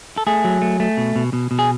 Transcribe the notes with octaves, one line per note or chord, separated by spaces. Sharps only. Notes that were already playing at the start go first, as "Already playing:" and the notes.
A4
A3 G#4
F#3
A3
A3
B2
B2
B2
B2
G#4